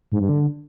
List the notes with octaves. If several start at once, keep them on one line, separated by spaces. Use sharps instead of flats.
G#2
G2
D3